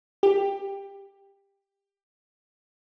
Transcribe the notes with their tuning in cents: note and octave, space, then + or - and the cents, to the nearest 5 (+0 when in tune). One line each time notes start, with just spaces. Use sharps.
G4 +15